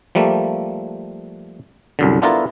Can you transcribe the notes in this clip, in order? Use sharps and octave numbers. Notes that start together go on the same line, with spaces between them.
F3 G3 A3 A#3
C2 F#2 D3
B3 D4 E4 F4 A4 A#4